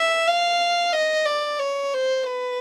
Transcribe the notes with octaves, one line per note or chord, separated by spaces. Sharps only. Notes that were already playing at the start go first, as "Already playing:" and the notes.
Already playing: E5
F5
D#5
D5
C#5
C5
B4